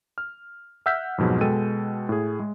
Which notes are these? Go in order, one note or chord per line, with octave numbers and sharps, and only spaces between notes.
F6
E5 F#5 E6 F6 G6 B6
F2 G#2 B2 F#3 G#3
B2 G#3 A4 G5 E6 D#7
A2 G#4
G#3